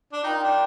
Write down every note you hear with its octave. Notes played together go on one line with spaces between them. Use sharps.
D4
D#4 F4 A#4 D5 G5
D4